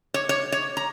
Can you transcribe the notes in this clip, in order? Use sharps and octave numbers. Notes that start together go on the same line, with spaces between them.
C#5
C#5
C#5
A#5